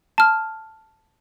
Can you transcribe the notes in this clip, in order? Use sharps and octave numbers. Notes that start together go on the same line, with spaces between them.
A5 F6